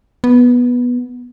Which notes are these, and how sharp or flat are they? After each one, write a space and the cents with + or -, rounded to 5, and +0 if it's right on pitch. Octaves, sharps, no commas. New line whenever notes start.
B3 -10